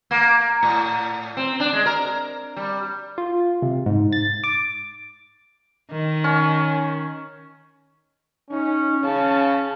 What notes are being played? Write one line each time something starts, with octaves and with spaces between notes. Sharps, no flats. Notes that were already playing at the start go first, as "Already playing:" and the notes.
A#3
A2
C4
D4
G#3
A#4
G3
F4
C3
G#2
A6
D6
D#3
C#4
C#4 D#4
C#3 C#4 A5